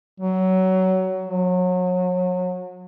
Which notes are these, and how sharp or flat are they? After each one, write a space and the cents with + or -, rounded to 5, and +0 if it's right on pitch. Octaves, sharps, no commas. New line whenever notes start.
F#3 +20
F#3 -30